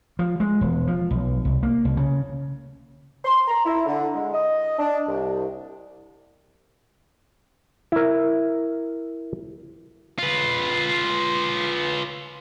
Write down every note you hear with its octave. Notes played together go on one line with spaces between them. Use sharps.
F3
G#3
E1
F3
B1
C2
A#3
C2
C#3
C6
A#5
E4
D3
G#3
D#5
D4
C2
E4 A#4
F4 B4